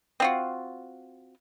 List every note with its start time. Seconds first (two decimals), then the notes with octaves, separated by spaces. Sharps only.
0.20 C4 F4 F#4